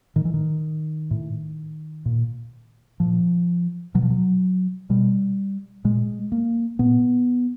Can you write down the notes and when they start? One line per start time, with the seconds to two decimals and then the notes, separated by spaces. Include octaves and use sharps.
0.16 A2 D#3
0.25 E3
0.34 D#3
1.11 A2
2.06 A#2
3.00 A#2 F3
3.94 B2 F#3
4.02 F3
4.10 F#3
4.90 B2 G3
5.84 A#2 G#3
6.32 A#3
6.79 A#2 B3